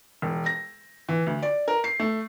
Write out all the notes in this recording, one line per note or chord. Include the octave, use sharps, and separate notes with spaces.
E1
A#6
E3
D2
D5
A#4
C7
A3